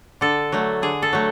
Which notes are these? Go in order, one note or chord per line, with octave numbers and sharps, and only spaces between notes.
D3 A4
F#3 A3
D3 G#4
A4
F#3 A3